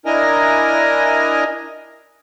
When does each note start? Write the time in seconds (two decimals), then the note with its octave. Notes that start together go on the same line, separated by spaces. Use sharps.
0.06 D4 E4 A#4 D#5 G#5 A#5